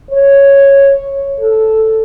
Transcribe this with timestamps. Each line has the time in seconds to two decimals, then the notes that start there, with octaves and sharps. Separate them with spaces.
0.11 C#5
1.39 A4